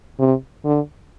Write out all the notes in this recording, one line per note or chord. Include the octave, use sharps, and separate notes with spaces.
C3
D3